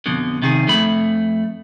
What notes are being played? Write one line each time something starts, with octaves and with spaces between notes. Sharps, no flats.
F2 B2 D3
C3 D#3 G#4
F2 A3 B5